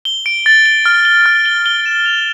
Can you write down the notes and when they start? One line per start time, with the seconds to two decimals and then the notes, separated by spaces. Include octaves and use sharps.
0.05 G7
0.26 D7
0.46 A6
0.66 G7
0.86 F6
1.05 G7
1.26 F6
1.46 G7
1.66 G7
1.86 E7
2.06 F7